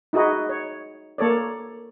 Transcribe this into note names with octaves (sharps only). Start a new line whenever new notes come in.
D#4 E4 F#4 G#4 D#5
C#5
A#3 A4 C#5 D5